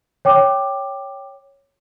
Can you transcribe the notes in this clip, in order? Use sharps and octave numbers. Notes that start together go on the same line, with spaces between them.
C#5 G5 D6